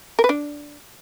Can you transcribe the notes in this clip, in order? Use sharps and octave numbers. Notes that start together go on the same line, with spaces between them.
A#4
B4
D4